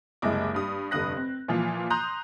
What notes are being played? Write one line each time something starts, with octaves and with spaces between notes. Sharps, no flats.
F#1 C2 G#3 E4 D#5 D6
G2 D#6
F1 G2 D3 D#6 F#6 A#6
C4
A#2 E3 F3 F4
A#5 C6 D#6 F#6 G6